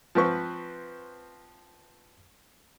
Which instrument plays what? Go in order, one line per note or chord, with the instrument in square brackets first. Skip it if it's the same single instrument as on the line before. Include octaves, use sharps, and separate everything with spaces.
[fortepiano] F3 C4 B4 C#6